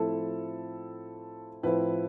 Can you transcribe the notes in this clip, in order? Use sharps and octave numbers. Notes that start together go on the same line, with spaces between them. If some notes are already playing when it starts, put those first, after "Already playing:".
Already playing: A2 F3 A3 C4 E4 A4
A2 F3 C4 E4 B4